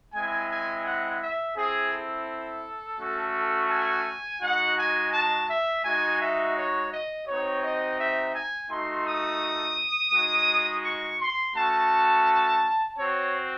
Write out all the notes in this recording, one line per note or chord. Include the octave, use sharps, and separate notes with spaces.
G#3 C4 E4 G#5
G#5
F#5
E5
C4 E4 G#4
A4
A3 C#4 F#4
G#5
G#3 D#4 F#4 F#5
G#5
A5
E5
G#3 D#4 F#4 G#5
E5
C#5
D#5
C4 D#4 F#4 C#5
D#5
E5
G#5
A3 D#4 F#4 C6
D#6
G#3 D#4 F#4
C#6
C6
A3 C#4 F#4 A5
C4 F#4 C#5